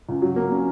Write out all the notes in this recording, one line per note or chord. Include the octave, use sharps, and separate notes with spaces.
C#2
F#3
A#3
C#4